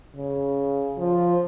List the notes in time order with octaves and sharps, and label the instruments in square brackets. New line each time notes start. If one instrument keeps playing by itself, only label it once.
[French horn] C#3
F3